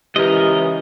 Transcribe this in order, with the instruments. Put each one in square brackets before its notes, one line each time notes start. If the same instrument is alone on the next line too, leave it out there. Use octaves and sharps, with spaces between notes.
[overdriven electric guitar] C#2 [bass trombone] E3 [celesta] G4 [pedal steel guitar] A#4 D#5